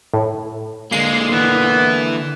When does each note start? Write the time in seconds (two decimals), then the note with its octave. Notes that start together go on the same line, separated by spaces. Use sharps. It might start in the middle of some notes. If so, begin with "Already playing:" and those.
0.14 A2
0.92 D3 G#3 A#3 C7
1.32 E3 B3